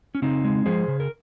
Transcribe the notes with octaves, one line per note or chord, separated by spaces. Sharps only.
C#4
C#3 C4 D#4
G#3
F3 G#4 C5
C#3
A#4